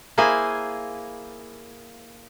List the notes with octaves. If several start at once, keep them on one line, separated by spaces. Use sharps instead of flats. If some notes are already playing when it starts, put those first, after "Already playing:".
A#3 E4 G#4 C5 G#5